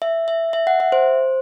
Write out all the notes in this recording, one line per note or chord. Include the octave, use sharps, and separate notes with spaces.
E5
E5
E5
F#5
E5
C5